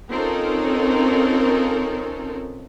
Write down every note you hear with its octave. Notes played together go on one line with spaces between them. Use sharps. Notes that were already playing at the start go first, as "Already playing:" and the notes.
C4 C#4 D#4 F4 A4 A#4